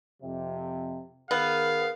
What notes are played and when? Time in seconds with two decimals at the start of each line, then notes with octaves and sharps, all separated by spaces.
0.23 F2 C3
1.31 D#3 B3 G#4 A#4 F5